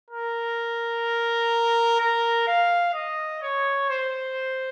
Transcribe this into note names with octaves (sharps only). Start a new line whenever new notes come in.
A#4
A#4
F5
D#5
C#5
C5